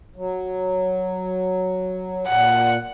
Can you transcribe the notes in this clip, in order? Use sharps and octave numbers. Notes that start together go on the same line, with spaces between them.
F#3
A#2 F#5